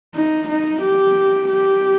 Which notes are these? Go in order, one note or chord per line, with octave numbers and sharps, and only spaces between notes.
D#4
D#4
G4
G4